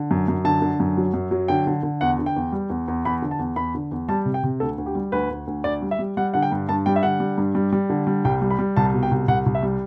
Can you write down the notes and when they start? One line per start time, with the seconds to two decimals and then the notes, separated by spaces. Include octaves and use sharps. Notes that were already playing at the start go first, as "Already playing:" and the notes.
Already playing: D3
0.11 F#2
0.28 F#2
0.44 D3 A5
0.62 D3
0.80 F#2
0.97 F#3
1.14 F#2
1.31 F#3
1.48 D3 G5
1.67 D3
1.83 D3
2.01 E2 F#5
2.19 D3
2.26 G5
2.36 E2
2.52 G3
2.70 E2
2.88 E2
3.05 E2 B5
3.22 D3
3.31 A5
3.39 E2
3.56 E2 B5
3.75 D3
3.91 E2
4.09 G3 A5
4.26 C3
4.34 G5
4.43 C3
4.60 D2 A4
4.78 D2
4.86 G4
4.95 G3
5.12 D2 B4
5.30 D2
5.47 D2
5.64 D2 D5
5.82 G3
5.91 E5
5.99 G3
6.17 G3 F#5
6.34 D3 F#5
6.42 G5
6.52 G2
6.69 G2 A5
6.86 G3 G5
6.96 E5
7.03 D3 F#5
7.20 G3
7.38 G2
7.55 G3
7.73 G3
7.90 D3
8.07 G3
8.25 C2 G5
8.42 G3
8.50 B5
8.59 G3
8.76 C2 A5
8.94 B2
9.03 G5
9.11 C2
9.28 C2 F#5
9.46 C2
9.55 E5
9.63 G3